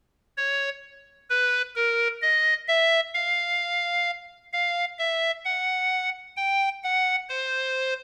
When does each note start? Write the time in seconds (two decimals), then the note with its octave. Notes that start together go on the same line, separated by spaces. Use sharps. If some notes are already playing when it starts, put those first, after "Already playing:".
0.37 C#5
1.30 B4
1.76 A#4
2.22 D#5
2.68 E5
3.14 F5
4.53 F5
4.99 E5
5.45 F#5
6.37 G5
6.83 F#5
7.29 C5